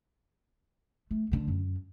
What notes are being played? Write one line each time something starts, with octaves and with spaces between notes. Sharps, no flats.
A3
D3 A3
F#2